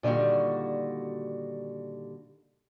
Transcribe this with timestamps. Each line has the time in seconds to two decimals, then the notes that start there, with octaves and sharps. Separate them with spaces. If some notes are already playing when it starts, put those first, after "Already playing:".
0.03 A#2 D3 D#3 G3 F#4